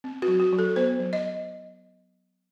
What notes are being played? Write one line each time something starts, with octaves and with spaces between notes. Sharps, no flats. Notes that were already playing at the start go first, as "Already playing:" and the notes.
C4
F#4
F#3
F#4
F#3
A4
B3 C5
F#3
D#5